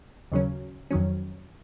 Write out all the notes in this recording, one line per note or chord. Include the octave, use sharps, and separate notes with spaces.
D#2 C#3 F#3 C#4
F2 D#3 F#3 C#4